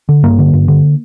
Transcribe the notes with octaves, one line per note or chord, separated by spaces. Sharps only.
D3
G2 A#3
D3
G2
D3